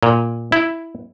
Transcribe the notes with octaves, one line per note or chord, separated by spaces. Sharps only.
A#2
E4